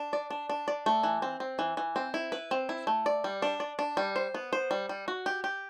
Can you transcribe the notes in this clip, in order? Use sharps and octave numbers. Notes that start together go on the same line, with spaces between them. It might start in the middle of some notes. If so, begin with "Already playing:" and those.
Already playing: D4
D5
D4
D4
D5
A3
E3
C4
C4
E3
E3
C4
E4
B4
C4
E4
A3
D5
G3
D4
D5
D4
G3
C5
B3
C5
G3
G3
F#4
G4
G4